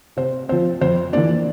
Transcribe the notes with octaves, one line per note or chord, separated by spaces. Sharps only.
C3 C5
F3 C4 C5
F2 C5
E3 A#3 D4 D5